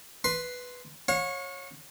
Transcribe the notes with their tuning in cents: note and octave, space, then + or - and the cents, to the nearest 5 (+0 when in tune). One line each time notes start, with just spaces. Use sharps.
B4 +0 C6 +0
C#5 -15 F5 +45